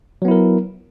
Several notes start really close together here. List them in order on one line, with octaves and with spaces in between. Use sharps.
F#3 B3 E4 A#4